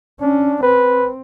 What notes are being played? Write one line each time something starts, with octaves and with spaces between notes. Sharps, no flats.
C#4 D4
C4 B4